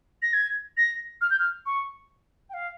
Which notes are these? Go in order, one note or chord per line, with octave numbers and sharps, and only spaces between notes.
A#6
G#6
A#6
F6
G6
F6
C#6
G5
F5